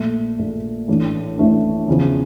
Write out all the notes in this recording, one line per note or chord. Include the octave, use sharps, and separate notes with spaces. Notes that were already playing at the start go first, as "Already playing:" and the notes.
Already playing: A#1 A#2 A3
A#1 A#2 A3
A1 A2 E3 A3 D4
A1 A2 E3 A3 D4
E2 C#3 F3